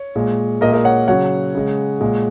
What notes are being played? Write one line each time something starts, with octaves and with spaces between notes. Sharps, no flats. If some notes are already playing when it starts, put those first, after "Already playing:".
Already playing: C#5
A#2 G#3
A#2 G#3 A#4 D#5
A#4 D#5
C#5 F#5
C#3 F#3 C#5 F#5
C#3 G#3
A#2 G#3